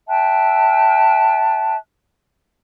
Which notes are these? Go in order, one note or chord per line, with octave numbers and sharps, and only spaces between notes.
E5 G5 A5 F#6